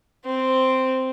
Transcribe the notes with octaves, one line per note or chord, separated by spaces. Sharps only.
C4